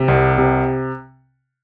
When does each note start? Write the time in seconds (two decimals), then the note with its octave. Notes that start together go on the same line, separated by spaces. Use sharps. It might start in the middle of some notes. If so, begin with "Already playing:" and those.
Already playing: C3
0.08 C2
0.38 C3